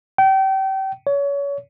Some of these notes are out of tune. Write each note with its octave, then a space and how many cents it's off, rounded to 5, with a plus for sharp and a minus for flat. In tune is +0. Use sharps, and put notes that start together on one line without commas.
G5 -30
C#5 +30